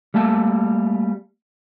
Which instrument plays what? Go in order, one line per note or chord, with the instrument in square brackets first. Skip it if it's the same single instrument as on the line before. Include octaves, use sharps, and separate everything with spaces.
[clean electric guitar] G3 A3 A#3 A5